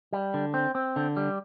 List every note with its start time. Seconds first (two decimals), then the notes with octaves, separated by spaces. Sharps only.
0.13 G3
0.34 D3
0.54 C4
0.75 C4
0.96 D3
1.17 G3